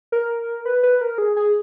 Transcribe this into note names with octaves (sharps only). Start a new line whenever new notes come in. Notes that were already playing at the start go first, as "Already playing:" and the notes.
A#4
B4
B4
A#4
G#4
G#4